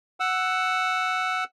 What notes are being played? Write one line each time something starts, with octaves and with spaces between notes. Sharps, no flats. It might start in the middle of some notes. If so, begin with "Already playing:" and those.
F#5 E6